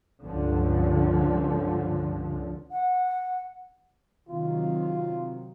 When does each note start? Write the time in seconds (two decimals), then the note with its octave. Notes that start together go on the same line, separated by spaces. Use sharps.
0.23 C#2 G2 D3 F3
2.71 F#5
4.29 C3 D#3 F#3 F4